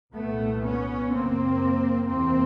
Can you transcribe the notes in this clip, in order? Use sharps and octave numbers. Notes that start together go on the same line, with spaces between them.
C2 A#2 A3 B3
B3 C#4
F#2 C#3 A#3 C4
E2 C3 A#3 C4